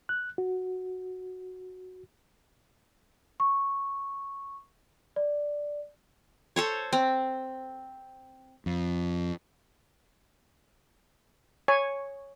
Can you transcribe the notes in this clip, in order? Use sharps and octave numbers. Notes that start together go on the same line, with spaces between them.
F#6
F#4
C#6
D5
A4 C5 C#5
C4
F2
C#5 G#5